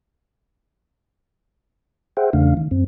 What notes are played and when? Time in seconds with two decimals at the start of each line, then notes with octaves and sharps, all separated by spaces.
2.17 G#4 C5 E5 F#5 G5
2.33 E2 C#3 A3 D4 F5
2.57 D#3
2.71 F#2 C4